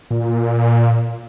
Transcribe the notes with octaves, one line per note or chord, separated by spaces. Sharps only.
A#2